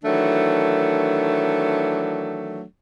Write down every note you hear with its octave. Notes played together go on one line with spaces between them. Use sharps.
D#3 E3 F#3 A3 D4